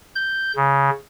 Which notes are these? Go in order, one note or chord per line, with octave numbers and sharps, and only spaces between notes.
G6
C#3